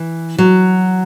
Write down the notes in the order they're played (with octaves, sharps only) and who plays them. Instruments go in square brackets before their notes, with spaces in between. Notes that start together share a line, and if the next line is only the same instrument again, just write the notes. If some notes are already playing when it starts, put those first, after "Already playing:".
Already playing: [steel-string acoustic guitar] E3
F#3